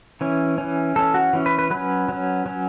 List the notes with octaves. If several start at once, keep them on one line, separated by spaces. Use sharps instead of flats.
E3 C#4
E3 C#4
E3 C#4 A4
F#4
E3 C#4
B4
B4
F#3 C#4 B4
F#3 C#4
F#3 C#4